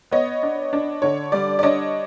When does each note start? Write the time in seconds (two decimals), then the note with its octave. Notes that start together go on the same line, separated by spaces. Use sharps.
0.11 B3 C#5 D#5
0.43 D4
0.73 D4
1.02 D3 C#5
1.32 G3 D5
1.59 D5
1.63 D4 C#5 D#5